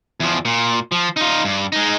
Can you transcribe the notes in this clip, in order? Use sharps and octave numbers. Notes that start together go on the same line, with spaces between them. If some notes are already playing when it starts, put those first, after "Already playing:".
E2 F3
A#2
F3
D#4 F4
G2
G#3 D#4